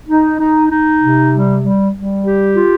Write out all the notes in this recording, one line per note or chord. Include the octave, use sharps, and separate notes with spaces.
D#4
D#4
D#4
C3
G3
G3
G3
G4
F4